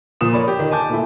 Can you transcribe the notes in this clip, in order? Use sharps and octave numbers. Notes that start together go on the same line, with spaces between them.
A#2 F3 D#6 E7
A#4 C#5 D5 B5
G4
D#3
G#5 A5 D6 G6
A#2 A3 E4